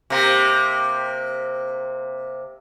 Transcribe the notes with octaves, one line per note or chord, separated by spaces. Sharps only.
C3 A#3